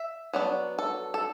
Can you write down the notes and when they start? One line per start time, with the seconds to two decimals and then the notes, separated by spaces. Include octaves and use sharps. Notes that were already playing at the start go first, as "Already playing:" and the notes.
Already playing: E5
0.33 F#3 B3 D4
0.79 A4
1.14 A4